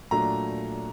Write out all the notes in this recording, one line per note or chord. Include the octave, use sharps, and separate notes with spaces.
A#2 F#3 A3 D4 A#5